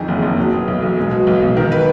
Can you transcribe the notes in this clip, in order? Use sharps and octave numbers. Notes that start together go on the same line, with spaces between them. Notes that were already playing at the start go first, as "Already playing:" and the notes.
Already playing: F2 D#3 G#4
F#1
F#1
F#3
B2
B1
B1
G#3
B2
B1
B1
D#3 A#4
B4